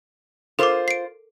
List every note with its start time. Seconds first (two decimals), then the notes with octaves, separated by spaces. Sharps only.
0.59 F4 A4 A#4 C5 D6
0.88 C7 D7